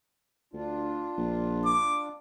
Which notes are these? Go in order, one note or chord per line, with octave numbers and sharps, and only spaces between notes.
D2 D4 F4
A#1
D6